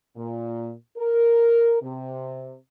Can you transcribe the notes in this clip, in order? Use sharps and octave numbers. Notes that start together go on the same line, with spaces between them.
A#2
A#4
C3